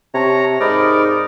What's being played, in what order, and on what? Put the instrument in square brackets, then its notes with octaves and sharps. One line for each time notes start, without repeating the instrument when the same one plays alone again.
[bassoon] C3 [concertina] C#5 A#5 [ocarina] A5
[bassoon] G#2 [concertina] D#4 A#4 D5 [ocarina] B5